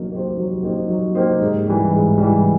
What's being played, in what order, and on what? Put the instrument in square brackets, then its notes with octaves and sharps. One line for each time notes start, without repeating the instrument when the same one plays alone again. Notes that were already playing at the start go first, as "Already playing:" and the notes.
Already playing: [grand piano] F#3 A#3 D#4 G4
A#3 D#4 G4 C5
F#3
A#3 D#4 G4 C5
F#3
A#3 D#4 G4 C5
G#2
E3 G3
G#2
E3 G3